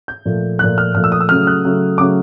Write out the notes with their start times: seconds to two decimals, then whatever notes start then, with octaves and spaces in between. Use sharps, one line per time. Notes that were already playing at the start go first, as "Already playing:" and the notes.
0.08 G6
0.26 A#2 F3 A3
0.59 A#2 F3 A3 F#6
0.78 F6
0.94 A#2 F3 A3 F6
1.04 E6
1.12 D#6
1.21 E6
1.29 C#3 F#3 A3 F6
1.47 F#6
1.64 C#3 F#3 A3
1.98 C#3 F#3 A3 D6